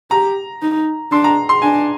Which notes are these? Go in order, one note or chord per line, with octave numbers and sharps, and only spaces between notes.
G4 A#5
D#4
D4 C6
A#5
C6
D4 G#5